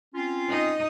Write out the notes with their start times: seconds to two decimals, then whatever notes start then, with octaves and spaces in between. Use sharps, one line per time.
0.15 C4 C#4 F4
0.49 D#4 D#5